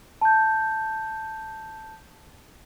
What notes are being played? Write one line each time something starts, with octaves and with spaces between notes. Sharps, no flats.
A5 G6